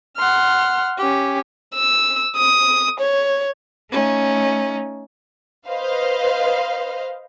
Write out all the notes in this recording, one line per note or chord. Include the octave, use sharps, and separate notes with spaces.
F#5 C6 F6
C#4 G4
E6
D#6
C#5
A3 C#4 D#4
B4 C5 D#5 F5